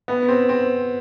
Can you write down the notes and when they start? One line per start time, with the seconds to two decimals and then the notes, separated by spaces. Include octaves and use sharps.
0.08 B3
0.28 C4
0.49 C4